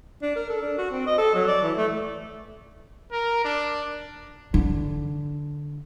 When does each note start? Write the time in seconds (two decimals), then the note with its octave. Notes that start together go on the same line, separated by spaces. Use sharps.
0.22 D4
0.36 A#4
0.49 A4
0.62 D4
0.78 F#4
0.91 C4
1.07 D#5
1.18 A4
1.35 F#3
1.47 D5
1.62 E3
1.77 A3
3.12 A#4
3.45 D4
4.54 D3